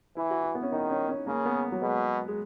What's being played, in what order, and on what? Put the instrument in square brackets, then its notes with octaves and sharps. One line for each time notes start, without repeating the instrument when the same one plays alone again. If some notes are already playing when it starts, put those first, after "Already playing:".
[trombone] E3 [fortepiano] E4
[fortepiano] F#4
E4
B3
C#4
[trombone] D#3 [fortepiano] D#4
[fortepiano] C#4
C#4
[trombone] C#3 [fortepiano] A#3
[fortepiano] B3
F#3
[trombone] B2 [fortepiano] G#3
[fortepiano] G#3